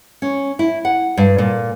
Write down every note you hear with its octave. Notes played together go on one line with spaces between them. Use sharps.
C#4
E4
F#5
G2
A#2